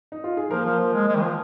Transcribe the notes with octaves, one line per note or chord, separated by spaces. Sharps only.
D#4
F4
G#4
F3 A#3 A#4
F3
F3
G#3
G#3
D#3
F3